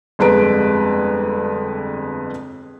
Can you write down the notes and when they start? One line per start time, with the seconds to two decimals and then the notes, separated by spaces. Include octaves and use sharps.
0.19 G1 F2 G#3 B4 A#5 D7